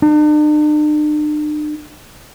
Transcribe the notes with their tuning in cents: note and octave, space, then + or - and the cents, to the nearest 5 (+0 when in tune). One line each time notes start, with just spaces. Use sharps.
D4 +45